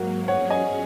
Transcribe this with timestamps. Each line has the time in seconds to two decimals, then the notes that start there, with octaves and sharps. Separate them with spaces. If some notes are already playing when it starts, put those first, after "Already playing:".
Already playing: G#2 F#3 A#3 F#4 A#4
0.28 F#3 C#4 G#4 C#5 F#5
0.50 D#5 G#5